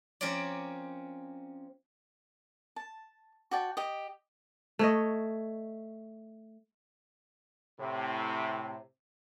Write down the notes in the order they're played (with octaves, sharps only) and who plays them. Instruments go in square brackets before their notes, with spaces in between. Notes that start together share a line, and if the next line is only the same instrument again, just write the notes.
[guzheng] F3 C4 C#4 A#4 C#5 D5
[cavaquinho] A5
F#4 D5 G5 A5
G4 D#5
[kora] A3 C#5 D#5
[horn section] A2 C3